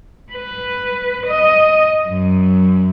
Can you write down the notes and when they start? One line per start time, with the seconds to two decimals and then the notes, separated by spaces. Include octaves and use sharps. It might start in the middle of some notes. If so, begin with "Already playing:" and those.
0.33 B4
1.27 D#5
2.09 F#2